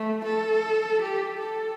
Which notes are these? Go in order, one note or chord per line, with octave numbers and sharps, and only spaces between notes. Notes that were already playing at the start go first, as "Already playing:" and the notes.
Already playing: A3
A4
G4
A4